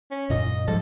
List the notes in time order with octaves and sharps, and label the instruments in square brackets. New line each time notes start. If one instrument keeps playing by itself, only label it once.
[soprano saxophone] C#4
[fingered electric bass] F#2 A#2 [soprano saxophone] D#5
[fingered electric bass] G#2 F3 G3 [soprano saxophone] A4